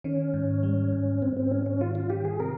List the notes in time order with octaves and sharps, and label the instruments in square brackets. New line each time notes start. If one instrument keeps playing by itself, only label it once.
[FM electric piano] D#3 [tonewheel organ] C#4
[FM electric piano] G#2
G3
G#2
[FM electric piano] G#2 [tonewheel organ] C4
[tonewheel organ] C4
[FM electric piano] G#2 [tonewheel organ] C#4
[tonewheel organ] C#4
[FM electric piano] D#3 [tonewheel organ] F4
[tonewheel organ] F4
[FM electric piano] D#3 [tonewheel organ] G4
[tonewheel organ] G#4
[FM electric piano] C3 [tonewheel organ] A#4